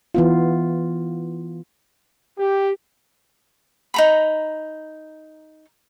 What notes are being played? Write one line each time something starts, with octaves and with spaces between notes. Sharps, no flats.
E3 B3 F4
G4
D#4 A#5 B5